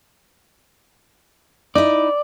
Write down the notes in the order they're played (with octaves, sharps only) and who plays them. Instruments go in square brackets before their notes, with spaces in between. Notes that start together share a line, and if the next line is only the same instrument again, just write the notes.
[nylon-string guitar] D#4 E4 [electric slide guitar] D5